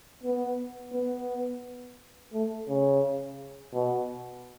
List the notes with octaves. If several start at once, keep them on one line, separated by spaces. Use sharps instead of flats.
B3
B3
A3
C#3
B2